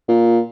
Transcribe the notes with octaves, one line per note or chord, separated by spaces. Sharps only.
A#2